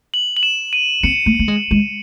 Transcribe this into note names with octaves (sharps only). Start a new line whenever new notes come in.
F#7
F#7
E7
D#7
C4 C#7
A3
A3
G#3
G#3